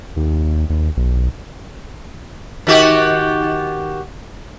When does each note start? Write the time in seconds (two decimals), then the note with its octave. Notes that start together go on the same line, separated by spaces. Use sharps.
0.16 D#2
0.70 D#2
0.97 B1
2.67 D#3 F#4 G4